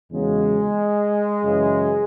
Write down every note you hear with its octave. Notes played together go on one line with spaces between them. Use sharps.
E2 C#3 F#3 G#3
F#2 C#3 E3